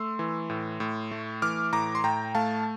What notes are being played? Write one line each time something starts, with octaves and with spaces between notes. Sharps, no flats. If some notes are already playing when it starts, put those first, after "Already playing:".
Already playing: A3 C6 E6
E3
A2
A2
A3
E3 D6 F6
A2 A#5 D6
C6
A2 G5 A#5
A3 F5 A5